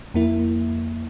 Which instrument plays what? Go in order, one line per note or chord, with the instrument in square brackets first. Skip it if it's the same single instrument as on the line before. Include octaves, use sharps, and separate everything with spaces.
[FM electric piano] F2 A#3 E4